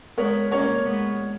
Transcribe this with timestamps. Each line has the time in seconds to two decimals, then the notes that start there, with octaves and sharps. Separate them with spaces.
0.17 G#3 B3 A#4 C#5
0.51 A#3 C#4 A#4 C#5
0.85 G#3 B3